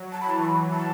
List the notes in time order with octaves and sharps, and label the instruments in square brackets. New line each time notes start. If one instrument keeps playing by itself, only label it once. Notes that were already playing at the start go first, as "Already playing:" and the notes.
Already playing: [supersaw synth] F#3
[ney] A5
B5
[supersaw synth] E3 [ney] A5
[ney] C#6
B5
A5